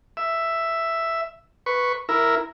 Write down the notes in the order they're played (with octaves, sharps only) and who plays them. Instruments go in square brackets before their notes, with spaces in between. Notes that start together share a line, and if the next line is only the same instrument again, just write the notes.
[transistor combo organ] E5
B4 C#6
E4 A#4